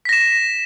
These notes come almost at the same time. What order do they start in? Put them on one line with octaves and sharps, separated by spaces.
B6 A#6 E7